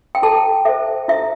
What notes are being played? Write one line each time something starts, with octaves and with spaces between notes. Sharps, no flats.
G5
E4 A4 A5
A4 C5 E5
E4 E5